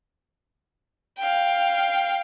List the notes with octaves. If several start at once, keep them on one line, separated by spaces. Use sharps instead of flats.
F5 G5